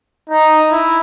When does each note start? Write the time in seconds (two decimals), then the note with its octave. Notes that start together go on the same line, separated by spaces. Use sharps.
0.30 D#4
0.71 E4